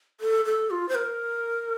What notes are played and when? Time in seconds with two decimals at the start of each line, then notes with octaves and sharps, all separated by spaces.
0.21 A4
0.45 A4
0.70 F4
0.89 C5
0.95 A#4